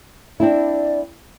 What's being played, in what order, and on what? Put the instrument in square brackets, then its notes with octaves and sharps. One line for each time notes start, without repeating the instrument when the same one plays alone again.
[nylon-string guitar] C4 D4 E4 [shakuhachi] D5